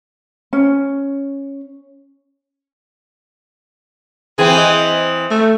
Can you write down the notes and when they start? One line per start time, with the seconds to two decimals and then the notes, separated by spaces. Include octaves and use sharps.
0.53 C#4
4.38 E3 C4 G#4
4.58 D#5
5.30 A3